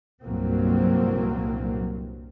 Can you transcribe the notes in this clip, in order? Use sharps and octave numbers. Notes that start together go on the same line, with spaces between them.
C2 G2 A#2 F#3 A#3 C4